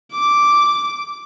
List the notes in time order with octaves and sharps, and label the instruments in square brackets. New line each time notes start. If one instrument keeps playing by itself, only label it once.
[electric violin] D6